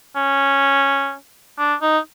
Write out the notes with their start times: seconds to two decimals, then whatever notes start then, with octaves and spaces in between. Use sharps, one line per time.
0.16 C#4
1.58 D4
1.82 D#4